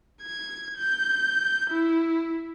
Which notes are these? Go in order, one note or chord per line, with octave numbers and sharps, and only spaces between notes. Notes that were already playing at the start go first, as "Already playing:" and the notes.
G#6
G6
E4